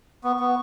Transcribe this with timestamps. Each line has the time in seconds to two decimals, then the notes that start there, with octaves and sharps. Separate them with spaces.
0.24 B3 C#6
0.40 B3